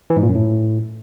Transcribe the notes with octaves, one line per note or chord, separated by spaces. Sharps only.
E3
G#2
A#2
F#2
A2